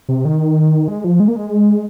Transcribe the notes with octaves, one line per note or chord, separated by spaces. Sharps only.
C3
D#3
G#3
F3
G#3
A#3
G#3